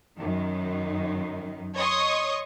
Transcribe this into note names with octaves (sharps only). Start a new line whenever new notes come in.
F#2 D#3
C#5 D#5 C6 C#6 D#6